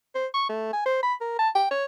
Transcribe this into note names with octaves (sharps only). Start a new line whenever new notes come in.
C5
C#6
A3
G#5
C5
B5
A#4
A5
G5
C#5